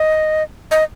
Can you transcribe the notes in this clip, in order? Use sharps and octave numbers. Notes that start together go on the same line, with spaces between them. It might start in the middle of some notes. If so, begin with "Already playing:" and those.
Already playing: D#5
D#5